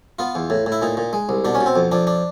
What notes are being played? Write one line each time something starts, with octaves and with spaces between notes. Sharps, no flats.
B3 F4
E2
A2
A2
E4
A#2 D#4
A#2
G#3
C2
B2 D4
C#4
B2
C4
F2
F2 D4
D4